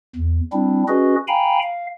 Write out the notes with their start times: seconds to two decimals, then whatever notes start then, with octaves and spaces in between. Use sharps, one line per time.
0.16 E2
0.53 G3 C4 D4 E4
0.88 C#4 F#4 G#4 B4 D#5
1.28 F5 G5 G#5 A#5 B5
1.62 F5